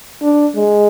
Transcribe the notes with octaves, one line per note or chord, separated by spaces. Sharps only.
D4
G#3